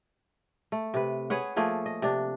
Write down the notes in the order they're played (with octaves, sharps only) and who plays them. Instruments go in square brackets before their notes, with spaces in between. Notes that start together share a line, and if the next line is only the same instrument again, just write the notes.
[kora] A3
C3 B4
G#4 B4 C#5 F#5
F3 A3 A#3 G#4
D#5
C3 D4